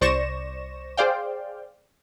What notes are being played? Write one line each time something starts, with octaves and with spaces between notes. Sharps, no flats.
C2 C5 D5 C#6 A#6 E7
G#4 C5 D5 F5 G5